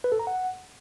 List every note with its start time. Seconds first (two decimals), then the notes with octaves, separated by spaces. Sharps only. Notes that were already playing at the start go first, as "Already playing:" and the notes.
0.04 B4
0.12 A4
0.19 A#5
0.27 F#5